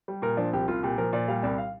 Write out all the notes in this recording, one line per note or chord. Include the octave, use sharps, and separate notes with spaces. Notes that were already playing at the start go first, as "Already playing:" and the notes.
G3
A#2 A#4
F3 D4
C2 G4
C2 F4
A#2 G4
F3 A#4
A#2 D5
G3 F5
C2 D5
F5